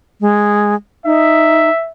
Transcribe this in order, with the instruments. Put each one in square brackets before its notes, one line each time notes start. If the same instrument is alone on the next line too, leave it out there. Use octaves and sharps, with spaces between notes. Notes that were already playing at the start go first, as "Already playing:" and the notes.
[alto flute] G#3
[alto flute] D#4 [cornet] E5